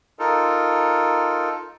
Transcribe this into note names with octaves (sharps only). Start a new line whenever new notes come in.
D#4 F4 A4 A#4